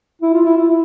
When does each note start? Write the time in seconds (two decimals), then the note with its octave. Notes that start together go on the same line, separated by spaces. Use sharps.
0.22 E4
0.34 F4
0.45 E4
0.57 F4
0.68 E4